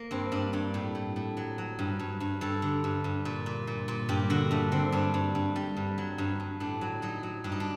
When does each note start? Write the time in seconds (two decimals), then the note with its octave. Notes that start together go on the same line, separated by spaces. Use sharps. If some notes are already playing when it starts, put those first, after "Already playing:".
Already playing: A#3
0.11 G2 C4
0.32 G2 D4
0.53 G2 G4
0.74 A2
0.95 A2
1.16 A2
1.37 F#3
1.58 F#3
1.79 G2
1.99 G2
2.20 G2
2.41 G2 A4
2.62 D3
2.84 G2
3.04 G2
3.25 A#2
3.46 A#2
3.67 A#2
3.88 A#2
4.09 G2 G4
4.30 D3 F#4
4.51 G2 A3
4.72 D3 C4
4.92 G2 D4
5.14 G2
5.35 G2
5.56 G3
5.76 G2
5.98 F#3
6.18 G2
6.40 G2
6.60 A2 D4
6.81 F#3
7.02 F#3 D#4
7.23 F#3
7.44 G2 D4
7.52 D#4
7.60 D4